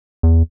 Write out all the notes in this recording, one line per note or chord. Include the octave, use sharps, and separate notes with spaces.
E2